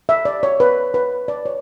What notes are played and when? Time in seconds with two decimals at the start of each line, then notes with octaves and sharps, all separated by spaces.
0.09 E5
0.25 D5
0.43 C#5
0.60 B4
0.94 B4
1.28 D5
1.46 C#5